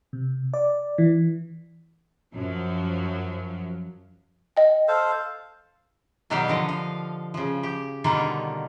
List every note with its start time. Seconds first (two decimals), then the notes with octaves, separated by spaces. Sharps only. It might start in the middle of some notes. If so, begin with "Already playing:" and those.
0.13 C3
0.54 D5
0.98 E3
2.33 F#2 F3 F#3
4.57 D#5 G5
4.88 A4 C5 F5
6.30 B2 D#3 F#3 G3 G4 F5
6.48 D3 F3 D#5
6.69 F5
7.34 C#3 F3
7.63 G4
8.04 B2 D3 D#3 G3 A#3 F4